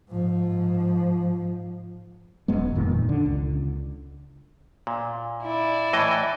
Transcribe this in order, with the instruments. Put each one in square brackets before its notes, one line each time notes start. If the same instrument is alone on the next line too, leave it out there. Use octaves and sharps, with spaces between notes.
[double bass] G#2 F3
[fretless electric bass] E1 F#2 G#3 B3
F#1 F2 A#2 D#3
D3
C#2
[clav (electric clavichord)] A#2
[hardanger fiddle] E4 D5
[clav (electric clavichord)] A2 E3 D#5